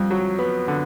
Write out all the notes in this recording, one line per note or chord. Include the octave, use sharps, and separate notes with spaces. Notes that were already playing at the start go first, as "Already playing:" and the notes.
Already playing: F2 G3
F#3
B3
D3